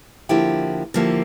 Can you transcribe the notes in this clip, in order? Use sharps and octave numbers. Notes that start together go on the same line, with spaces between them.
D3 F3 A#3 E4 G4
D3 F3 A#3 E4 G4